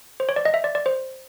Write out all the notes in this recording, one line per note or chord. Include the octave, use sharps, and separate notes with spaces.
C5
C#5
D5
D#5
E5
D5
D5
C5